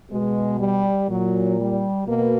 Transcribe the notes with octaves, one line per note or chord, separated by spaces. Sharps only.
B2 G#3
G3
A#2 F#3
G3
B2 A#3